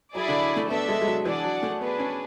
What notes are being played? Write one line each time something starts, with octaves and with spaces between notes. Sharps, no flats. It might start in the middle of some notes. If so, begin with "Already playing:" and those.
F#3 E4 G#4 D5
D3
A3
B3 D4 A4 E5
G#3
G#3
F#3
E3 D4 G#4 D5 F#5
F#3
A3
B3 D4 G#4 B4
C#4